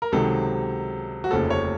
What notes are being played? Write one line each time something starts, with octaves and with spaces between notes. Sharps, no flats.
A#4
C#2 C3 D#3 F#3 A4
F#4
F1 D#2 C#3 F3 A4
C#5